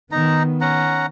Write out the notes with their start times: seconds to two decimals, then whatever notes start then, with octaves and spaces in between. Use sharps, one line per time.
0.12 D#3 B3 D#4 A#5
0.61 C#4 F#5 A#5